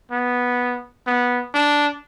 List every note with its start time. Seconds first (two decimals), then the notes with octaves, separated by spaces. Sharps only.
0.11 B3
1.07 B3
1.54 D4